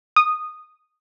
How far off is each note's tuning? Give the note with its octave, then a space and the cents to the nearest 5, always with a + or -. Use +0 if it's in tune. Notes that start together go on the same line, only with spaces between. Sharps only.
D#6 -10